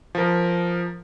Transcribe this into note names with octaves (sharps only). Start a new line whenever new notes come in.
F3 A#4